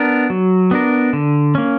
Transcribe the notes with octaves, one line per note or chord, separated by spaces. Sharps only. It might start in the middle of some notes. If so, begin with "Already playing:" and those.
Already playing: B3 D4 A#4
F#3
B3 D4 A#4
D3
A#3 C#4